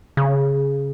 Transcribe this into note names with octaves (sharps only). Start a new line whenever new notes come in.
C#3